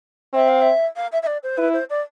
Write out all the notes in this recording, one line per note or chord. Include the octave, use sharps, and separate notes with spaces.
C4 E5
F5
E5
F5
E5
E5
D5
C5
E4 B4
C5
D5